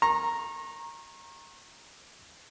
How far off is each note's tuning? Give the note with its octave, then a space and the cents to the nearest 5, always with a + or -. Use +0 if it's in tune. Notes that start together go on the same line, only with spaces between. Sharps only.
A#5 +0 C#6 -35